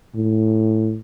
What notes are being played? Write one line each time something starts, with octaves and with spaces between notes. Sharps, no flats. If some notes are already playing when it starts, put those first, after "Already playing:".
A2